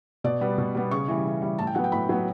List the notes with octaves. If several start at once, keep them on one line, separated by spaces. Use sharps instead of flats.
B2 D5
G3 B3
B2
G3 B3
C#3 C#6
E3 G3
C#3
E3 G3
A2 A5
G5
F#3 B3 F#5
G5
A2 B5
F#3 B3